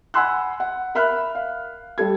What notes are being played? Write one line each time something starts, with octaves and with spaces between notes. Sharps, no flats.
F#5 G#5 B5 C6 E6 F#6
F#5
A#4 E5 B5 F6 F#6
F5
G3 A4 G#6